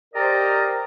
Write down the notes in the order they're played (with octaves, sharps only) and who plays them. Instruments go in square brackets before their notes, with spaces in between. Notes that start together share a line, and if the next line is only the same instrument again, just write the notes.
[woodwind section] G4 A#4 C5 D5 D#5 A#5